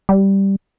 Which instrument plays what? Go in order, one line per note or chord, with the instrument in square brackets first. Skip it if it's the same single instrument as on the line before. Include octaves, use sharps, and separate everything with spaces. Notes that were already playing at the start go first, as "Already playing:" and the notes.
[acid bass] G3